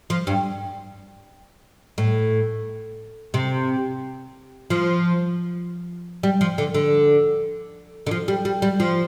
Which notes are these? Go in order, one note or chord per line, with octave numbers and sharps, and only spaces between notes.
F3
G2
A2
C3
F3
G3
F3
D3
D3
D3
F3
G3
G3
G3
F3